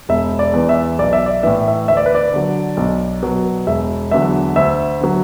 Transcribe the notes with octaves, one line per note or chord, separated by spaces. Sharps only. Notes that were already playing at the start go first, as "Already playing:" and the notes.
E1 E5
D5
E2 E3
E5
B1 D5
E5
D5
A2 E3 E5
E5
D2 E5
D5
B4
D5
D3 F#3
B1
B2 F#3
E1 E5
E2 D3 F#3 E5
D2 E5
D3 F#3